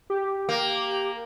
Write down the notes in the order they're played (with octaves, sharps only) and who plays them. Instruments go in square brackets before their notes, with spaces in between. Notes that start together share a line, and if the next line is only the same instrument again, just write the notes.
[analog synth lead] G4
[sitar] A#3